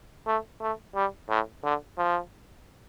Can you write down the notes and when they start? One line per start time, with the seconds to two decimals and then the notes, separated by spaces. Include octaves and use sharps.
0.27 A3
0.61 A3
0.95 G3
1.29 A2
1.64 D3
1.98 F3